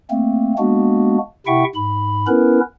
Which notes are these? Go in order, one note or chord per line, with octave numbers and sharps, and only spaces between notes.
A3 A#3 C4
G#3 A#3 B3 D4 F#4
C3 E4 E5 F#5 G5 C#6
G#2 B5
B3 C#4 E4 A#4 B4